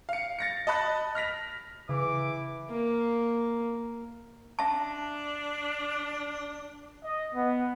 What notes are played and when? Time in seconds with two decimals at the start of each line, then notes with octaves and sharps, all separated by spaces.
0.09 F5 C#7
0.39 A6 A#6 C#7
0.67 D#5 A5 B5 F#6 A6
1.15 F6 A#6 B6 F7
1.89 C#3 E3 D6
2.70 A#3
4.59 D4 E5 A5
7.02 D#5
7.34 B3